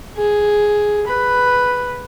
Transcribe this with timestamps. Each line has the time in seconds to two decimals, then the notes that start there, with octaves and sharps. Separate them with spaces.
0.17 G#4
1.07 B4